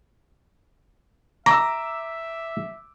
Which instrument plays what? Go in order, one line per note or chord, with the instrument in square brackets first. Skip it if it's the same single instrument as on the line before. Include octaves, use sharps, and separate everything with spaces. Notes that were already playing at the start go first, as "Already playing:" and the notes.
[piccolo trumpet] E5 [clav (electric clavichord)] A#5 [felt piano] D6 E6